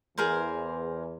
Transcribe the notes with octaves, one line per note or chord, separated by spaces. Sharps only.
E2 G#4 A#4 C5